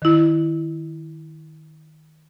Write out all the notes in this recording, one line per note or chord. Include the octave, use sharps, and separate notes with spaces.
D#3 E4